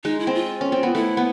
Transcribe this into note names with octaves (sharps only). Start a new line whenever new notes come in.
G#3 D#4
E4
C4
F4
C#4
C4
B3
A3 E4
B3